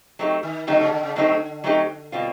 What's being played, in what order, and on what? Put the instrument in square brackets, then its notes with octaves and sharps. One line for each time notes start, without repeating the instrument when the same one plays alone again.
[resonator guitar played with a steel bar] F#3 A3 C4 D#4 G4
[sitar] D#3
[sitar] D3 [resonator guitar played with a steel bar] F#3 A3 C4 D#4 G4
[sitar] C#3
D3
C#3
[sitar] D3 [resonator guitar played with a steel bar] F#3 A3 C4 D#4 G4
[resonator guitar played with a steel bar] F#3 A3 C4 D#4 G4
B2 G3 C4 F4